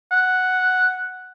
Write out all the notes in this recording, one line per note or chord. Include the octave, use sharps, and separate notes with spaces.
F#5